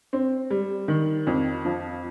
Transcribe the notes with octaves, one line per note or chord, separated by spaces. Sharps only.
C4
G3
D#3
F2
F3